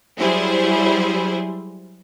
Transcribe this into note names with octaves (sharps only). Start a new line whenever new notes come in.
F#3 G3 E4 G#4 C5